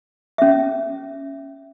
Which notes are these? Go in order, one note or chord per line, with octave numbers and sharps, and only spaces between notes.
C#4 E5